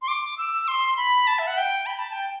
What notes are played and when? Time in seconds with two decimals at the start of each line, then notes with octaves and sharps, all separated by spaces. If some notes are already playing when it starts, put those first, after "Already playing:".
0.02 C6
0.08 D6
0.38 E6
0.68 C6
0.97 B5
1.27 A5
1.39 E5
1.47 F#5
1.57 G5
1.86 B5
1.99 A5
2.13 G5